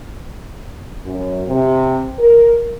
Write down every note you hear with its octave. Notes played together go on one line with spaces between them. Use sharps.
F#2
C3
A#4